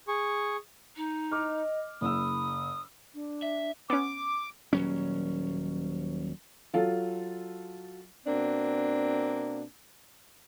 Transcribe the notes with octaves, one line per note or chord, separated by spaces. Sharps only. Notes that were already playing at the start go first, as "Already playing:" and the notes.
G#4 C#6
D#4
D#5 D6 F6
F#1 B5 D#6 E6
D4
E5
B3 C#4 D6
D#1 F#3 C#4
F#3 F4 A4
B2 A#3 C4 D4